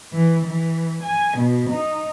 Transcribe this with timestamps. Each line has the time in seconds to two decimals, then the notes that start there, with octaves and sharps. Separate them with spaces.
0.12 E3
0.44 E3
1.01 G#5
1.37 B2
1.69 D#4